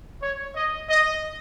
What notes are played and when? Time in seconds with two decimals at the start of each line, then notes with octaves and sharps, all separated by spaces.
0.22 C#5
0.55 D#5
0.90 D#5